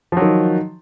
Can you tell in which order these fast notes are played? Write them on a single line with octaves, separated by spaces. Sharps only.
F3 F#3 D#3